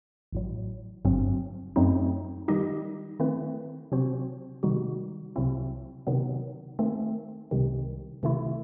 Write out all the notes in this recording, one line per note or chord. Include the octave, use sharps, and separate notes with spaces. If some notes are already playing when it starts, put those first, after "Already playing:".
A1 A2 F#3
G1 G2 F#3 C4
F#2 F#3 A3 C4 D#4
D#3 G3 D#4 G4 D#5
D#3 A3 C4 E4 B4
C3 F#3 C4 F#4 C5
C3 D#3 G3 D#4 F#4
C2 C3 F#3 C4 E4
C3 D#3 F#3 B3
D#3 A3 C4
C2 C3 D#3
C3 D#3 A3 E4